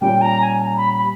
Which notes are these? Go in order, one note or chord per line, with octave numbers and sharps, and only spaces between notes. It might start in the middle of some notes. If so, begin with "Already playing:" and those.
A#2 G3 C#4 G5
A#5
G#5
A#5
B5
B5